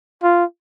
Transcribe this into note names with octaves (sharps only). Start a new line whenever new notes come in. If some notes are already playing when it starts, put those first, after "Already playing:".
F4